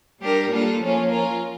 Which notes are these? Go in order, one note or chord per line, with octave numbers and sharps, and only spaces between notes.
G3 D4 G4 A#4
G3 A#3 D4 F4 A4
F3 A#3 C#4 F4
F3 C#4 F4 A#4